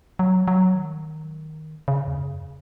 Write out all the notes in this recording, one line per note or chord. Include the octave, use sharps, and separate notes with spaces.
F#3
F#3
D#3
C#3
E2
F#2